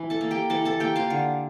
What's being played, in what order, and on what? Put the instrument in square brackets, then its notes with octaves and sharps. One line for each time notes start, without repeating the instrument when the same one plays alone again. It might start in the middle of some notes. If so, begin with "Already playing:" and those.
Already playing: [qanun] E3
A4 A5
A#3
G4 G5
E3 A4 A5
A4 A5
A#3 G4 G5
F4 F5
D3